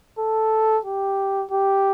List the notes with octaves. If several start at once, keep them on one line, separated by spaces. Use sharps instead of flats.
A4
G4
G4